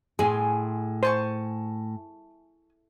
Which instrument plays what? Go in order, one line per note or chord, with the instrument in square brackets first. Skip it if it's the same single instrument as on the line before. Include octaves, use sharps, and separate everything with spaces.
[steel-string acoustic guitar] A2 [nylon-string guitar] G#4 [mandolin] G#5 C6
[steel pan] C5 [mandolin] G#5 A5 C#6